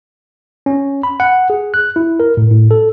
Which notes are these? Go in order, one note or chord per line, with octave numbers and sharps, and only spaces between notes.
C#4
B5
F#5
G#4
F#6
E4
A#4
A2
A2
A4